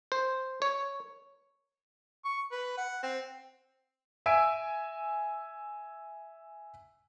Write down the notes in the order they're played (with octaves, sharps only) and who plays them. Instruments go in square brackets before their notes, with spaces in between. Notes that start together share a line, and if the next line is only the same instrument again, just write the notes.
[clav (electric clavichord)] C5
C#5
[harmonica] C#6
B4
F#5
C4
[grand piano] E5 G#5 E6 D7